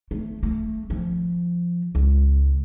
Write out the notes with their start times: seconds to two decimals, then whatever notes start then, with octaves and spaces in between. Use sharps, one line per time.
0.11 A3
0.43 A3
0.90 F3
1.95 C#2